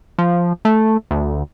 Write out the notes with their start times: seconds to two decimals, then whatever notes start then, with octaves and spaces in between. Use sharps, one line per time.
0.18 F3
0.65 A3
1.11 D2